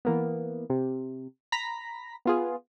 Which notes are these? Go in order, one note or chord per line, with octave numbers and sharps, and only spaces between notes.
E3 A#3 B3
C3
A#5 B5 A#6 B6
B3 F4 G#4